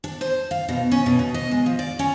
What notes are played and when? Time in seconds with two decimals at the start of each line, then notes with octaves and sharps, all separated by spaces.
0.04 D4
0.21 C5
0.51 F5
0.69 B2
0.92 C#4
1.06 B2
1.19 B2
1.34 D#5
1.51 G#3
1.66 F3
1.79 D5
1.99 C#4